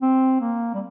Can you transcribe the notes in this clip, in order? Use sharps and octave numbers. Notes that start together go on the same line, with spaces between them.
C4
A#3
G3